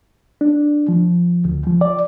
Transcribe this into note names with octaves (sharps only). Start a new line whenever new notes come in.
D4
F3
D2
F3
D5